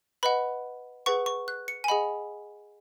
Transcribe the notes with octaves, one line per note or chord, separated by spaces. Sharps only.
B4 D#5 F#5 B5
G#4 B4 F#5 C#6
C#6
F#6
C#7
G#5
G#4 D#5 F#5 B5